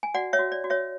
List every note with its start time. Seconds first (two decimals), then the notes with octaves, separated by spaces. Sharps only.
0.03 G#5
0.14 F#4 D5 F#5
0.33 C#5 E5
0.39 F#4
0.52 D5
0.64 F#4
0.70 C#5 E5